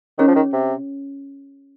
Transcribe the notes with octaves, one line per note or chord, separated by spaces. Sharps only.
D#3 C#4 G#4 C#5
F3
D#3
C3